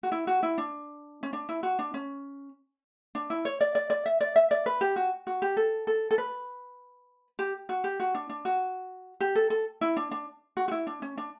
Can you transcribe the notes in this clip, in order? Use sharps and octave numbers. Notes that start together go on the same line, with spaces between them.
F#4
E4
F#4
E4
D4
C#4
D4
E4
F#4
D4
C#4
D4
E4
C#5
D5
D5
D5
E5
D5
E5
D5
B4
G4
F#4
F#4
G4
A4
A4
A4
B4
G4
F#4
G4
F#4
D4
D4
F#4
G4
A4
A4
E4
D4
D4
F#4
F#4
E4
D4
C#4
D4